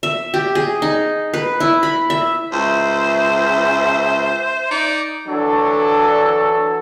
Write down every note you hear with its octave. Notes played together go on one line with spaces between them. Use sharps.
E5
G4
G#4
D#4
B4
E4
B5
E5
C#2 C5 E5
D#4 D5
E3 F#3 D4 A4